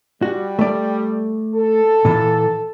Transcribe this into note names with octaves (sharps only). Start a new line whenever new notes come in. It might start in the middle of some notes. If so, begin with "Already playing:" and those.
G3 F#4
A3 D5
A4
A#2 E3